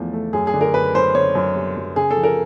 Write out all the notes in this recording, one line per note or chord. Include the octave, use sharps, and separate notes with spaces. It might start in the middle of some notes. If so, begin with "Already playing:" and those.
Already playing: E2 F3 A3
A3
F#2 G#4
G#4
D3
A#4
F#2 B4
F#2 C5
D3 C#5
F#2
G3
F#2
C#3 G#4
A4
F3
A#4